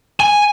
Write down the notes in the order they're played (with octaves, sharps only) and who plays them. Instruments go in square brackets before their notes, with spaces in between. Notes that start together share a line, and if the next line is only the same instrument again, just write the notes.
[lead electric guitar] G#5